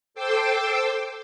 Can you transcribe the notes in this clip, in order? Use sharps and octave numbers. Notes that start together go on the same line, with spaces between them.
A4 C5 G5 C6 D6 E6